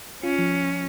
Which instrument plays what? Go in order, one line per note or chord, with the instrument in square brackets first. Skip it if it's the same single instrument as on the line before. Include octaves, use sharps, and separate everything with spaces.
[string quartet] C#4 [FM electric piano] F4
[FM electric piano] F3